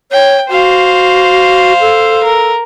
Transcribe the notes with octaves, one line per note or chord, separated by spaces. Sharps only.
C#5 G5
F#4 C5 F5
A4
A#4